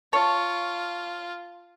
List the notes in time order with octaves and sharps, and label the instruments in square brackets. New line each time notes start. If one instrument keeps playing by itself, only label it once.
[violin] F4 [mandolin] C#5 [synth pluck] A5